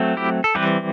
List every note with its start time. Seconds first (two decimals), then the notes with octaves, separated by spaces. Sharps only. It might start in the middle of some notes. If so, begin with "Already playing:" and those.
Already playing: F#3 A3 C4
0.17 E4 G4
0.44 A4
0.55 E3 G3 C4 G4 B4